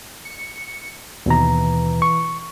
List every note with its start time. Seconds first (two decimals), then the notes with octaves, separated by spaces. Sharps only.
0.25 C#7
1.26 D#2 B2 E3 A#5
2.02 C#6